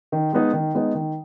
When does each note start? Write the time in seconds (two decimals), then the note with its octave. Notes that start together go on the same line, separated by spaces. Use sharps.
0.12 D#3
0.32 G#3 B3 D#4
0.53 D#3
0.74 G#3 B3 D#4
0.95 D#3